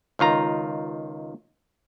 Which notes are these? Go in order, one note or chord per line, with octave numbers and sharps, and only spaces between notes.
C#2 D#3 F4 A#5